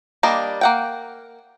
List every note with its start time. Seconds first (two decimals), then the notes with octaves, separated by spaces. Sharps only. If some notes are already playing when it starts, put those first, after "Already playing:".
0.23 G3 A#3 D4 D#5
0.61 A#3 F#5 G5